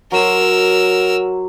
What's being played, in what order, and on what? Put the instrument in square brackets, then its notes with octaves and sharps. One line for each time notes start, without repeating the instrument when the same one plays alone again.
[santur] F#3 C6 [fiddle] A#4 E6